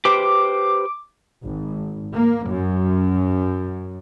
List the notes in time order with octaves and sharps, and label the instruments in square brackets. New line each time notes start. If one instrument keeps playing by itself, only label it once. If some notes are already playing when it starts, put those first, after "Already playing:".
[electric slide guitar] G4 B4 C5 [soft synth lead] D6
[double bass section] G#1
A#3
F#2